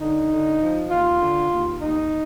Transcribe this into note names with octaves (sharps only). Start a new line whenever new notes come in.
D3 D#4
D3
F3
D#2 F4
D3
D#2
D#2 D#4